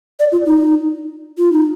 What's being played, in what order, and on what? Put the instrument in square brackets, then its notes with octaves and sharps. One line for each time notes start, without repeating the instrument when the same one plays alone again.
[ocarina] D5
F4
D#4
F4
D#4